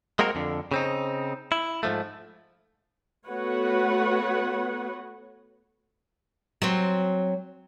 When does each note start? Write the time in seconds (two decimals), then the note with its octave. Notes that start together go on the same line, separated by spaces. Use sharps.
0.19 G#3 A#3 C4 F#4 A#4
0.35 F2 D3
0.72 C#3 C4 D#4
1.52 E4
1.83 G#2 F3 A3
3.26 A3 B3 F#4 B4 C#5 F#5
6.62 F#3 C4